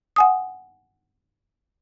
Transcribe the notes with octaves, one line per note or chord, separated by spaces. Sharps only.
F#5 G#5 D#6